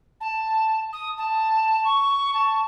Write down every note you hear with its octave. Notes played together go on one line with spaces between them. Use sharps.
A5
D#6
A5
C#6
A5